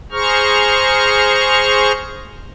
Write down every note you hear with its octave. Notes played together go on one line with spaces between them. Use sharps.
G#4 C5 A#5 C#6 F6